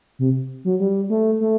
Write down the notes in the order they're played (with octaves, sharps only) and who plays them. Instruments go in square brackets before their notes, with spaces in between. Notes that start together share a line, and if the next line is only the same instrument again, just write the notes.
[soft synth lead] C3
F#3
G3
A3
A3